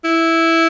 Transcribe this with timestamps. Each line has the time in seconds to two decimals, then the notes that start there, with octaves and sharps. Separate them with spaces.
0.05 E4